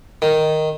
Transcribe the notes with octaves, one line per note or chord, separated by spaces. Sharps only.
D#3